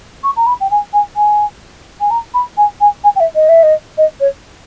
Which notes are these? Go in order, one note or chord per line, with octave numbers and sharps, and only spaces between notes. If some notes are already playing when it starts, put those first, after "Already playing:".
C#6
A#5
B5
G5
G#5
G#5
G#5
G#5
A#5
B5
G#5
G#5
G#5
G5
E5
D#5
E5
D#5
D#5
C#5